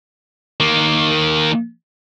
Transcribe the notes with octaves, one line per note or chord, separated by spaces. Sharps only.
D#3 A#3